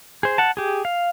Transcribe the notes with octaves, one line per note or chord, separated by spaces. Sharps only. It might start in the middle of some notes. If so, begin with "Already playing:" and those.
G#4 C5
F#5 A5
G4 G#4
F5